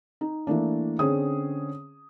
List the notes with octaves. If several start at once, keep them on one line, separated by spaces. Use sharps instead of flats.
D#4
E3 A3 A#3 D4
D3 C4 C#4 G#4 D#6